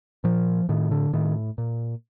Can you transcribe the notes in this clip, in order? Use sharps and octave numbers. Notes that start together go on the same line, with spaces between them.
A#2 F3
A2 D#3
D3
A2 D#3
A#2